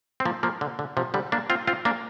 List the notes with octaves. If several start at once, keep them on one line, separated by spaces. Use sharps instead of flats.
C4
F3 A#3
F3 A#3
D3
D3
C3 F3
D3 G3
A#3 D4
C4 F4
C4 F4
A#3 D4